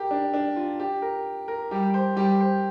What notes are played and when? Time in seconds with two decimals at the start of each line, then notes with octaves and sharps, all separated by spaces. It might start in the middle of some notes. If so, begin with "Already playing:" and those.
Already playing: G4 A#4
0.11 D4
0.34 D4
0.56 F4
0.80 G4
1.02 A#4
1.48 A#4
1.71 G3 G4
1.94 C5
2.16 G3 G4
2.40 C5